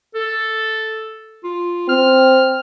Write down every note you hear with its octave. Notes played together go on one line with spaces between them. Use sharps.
A4
F4
C4 F6